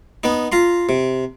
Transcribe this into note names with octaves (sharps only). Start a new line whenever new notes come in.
B3 D#4
F4 A#5 C6
C3